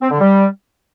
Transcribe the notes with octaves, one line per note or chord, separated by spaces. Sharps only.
C4
D3
G3